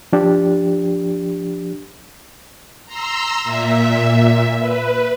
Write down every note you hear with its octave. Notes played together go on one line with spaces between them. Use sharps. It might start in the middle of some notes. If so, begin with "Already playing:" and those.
F3 D4 G4
A#5 C6 E6
A#2 E5
B4